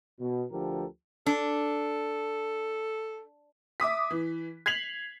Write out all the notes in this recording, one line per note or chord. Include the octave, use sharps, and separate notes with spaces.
B2
D2 D3 F3 G4 A4 A#4
D4 A4
E5 D6 D#6 B6
E3
G#6 B6 C7 F7 F#7